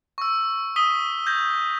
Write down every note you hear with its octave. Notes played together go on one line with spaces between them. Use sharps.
C#6 E6
D#6 B6 D#7 G7
G6 G#6 A#6